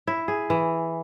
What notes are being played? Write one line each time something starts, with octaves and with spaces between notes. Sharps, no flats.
E4
G#4
E3